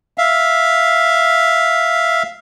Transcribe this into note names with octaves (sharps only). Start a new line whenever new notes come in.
E5 F5